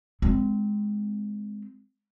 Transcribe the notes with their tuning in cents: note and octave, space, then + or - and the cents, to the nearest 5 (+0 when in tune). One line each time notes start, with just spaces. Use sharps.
G#3 +0 C4 -20